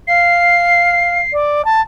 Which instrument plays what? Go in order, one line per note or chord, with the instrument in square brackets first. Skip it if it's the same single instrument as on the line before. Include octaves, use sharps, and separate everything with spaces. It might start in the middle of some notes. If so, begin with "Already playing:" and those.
[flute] F5 [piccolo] C7
[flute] D5
A5